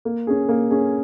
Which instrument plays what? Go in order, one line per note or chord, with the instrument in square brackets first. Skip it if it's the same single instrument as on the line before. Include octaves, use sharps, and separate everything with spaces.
[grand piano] A#3
C#4 G#4
A#3
C#4 G#4